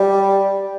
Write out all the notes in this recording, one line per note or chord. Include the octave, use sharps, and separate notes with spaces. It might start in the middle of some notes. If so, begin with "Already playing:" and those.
Already playing: G3